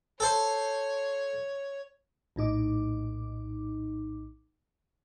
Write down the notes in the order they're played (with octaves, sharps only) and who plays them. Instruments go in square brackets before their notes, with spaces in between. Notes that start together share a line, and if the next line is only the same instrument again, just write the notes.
[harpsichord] A4 C5 [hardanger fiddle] C#5
[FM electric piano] A#1 A2 D#4 D6